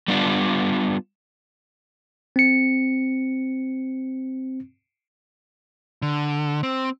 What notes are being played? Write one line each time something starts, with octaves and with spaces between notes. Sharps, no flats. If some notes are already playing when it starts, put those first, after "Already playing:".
G3 B3 D4 F4
C4 C#7
D3
C4